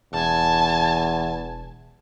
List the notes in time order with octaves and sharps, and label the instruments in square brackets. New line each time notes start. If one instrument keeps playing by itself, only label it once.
[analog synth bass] E1 [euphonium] E2 [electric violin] G#5 A5